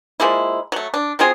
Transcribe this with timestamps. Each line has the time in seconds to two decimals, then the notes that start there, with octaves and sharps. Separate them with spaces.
0.20 F3 G#3 A#3 E4
0.72 F#3 A3
0.94 D4
1.19 F#3 C4 F4 G#4